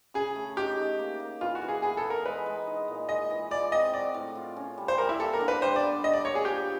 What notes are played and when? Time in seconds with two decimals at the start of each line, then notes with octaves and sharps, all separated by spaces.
0.14 C#3 G#4
0.36 A3
0.57 D#4 G4
0.77 D#4
0.99 A#3
1.20 A#3
1.41 E3 F4
1.55 F#4
1.62 E3
1.68 G#4
1.82 B3 G#4
1.97 A4
2.04 B3
2.10 A#4
2.26 G#3 B4
2.46 G#3
2.67 D#4
2.88 A#2
3.09 G#3 D#5
3.30 E3
3.51 F4 D5
3.72 C4 D#5
3.93 F#3 D5
4.14 A2
4.35 F4
4.56 C#4
4.78 G3
4.88 C5
4.98 G3 A#4
5.09 E4
5.19 A#3 A4
5.33 A#4
5.41 D3
5.48 B4
5.61 G3 C5
5.76 D5
5.83 B3
6.04 D4 D#5
6.14 D5
6.24 A#3 C#5
6.35 G#4
6.45 F3 G4